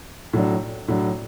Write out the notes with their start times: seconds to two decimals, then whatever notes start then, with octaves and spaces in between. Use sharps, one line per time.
0.33 A2 F#3 D4
0.88 A2 F#3 D4